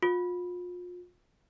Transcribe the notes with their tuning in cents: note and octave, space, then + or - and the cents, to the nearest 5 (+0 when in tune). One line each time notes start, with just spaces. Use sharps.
F4 +35